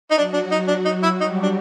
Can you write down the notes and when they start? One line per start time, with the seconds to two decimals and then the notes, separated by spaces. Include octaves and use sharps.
0.11 D#4
0.17 F#3 D4 F#4
0.33 D4
0.51 D#4
0.68 D4
0.85 D#4
1.03 E4
1.20 G3 D#4 G4
1.43 D4